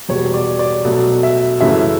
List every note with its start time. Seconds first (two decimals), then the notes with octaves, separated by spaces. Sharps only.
0.09 E2 B2 G3 C#5
0.34 D5
0.59 D5
0.85 B2 F#3 A3
1.23 E5
1.61 F#2 C#3 E3 A3 E5